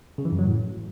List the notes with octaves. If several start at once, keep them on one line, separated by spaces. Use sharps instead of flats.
C#3
E3
F#2
F#3
A2